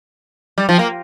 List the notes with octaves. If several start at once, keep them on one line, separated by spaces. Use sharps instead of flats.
G3
F3
A#3